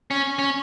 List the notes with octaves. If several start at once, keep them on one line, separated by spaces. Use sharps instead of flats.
C#4
C#4